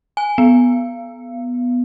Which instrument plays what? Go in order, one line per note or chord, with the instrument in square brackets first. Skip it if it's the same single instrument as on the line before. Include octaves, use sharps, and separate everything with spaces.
[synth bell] G#5
B3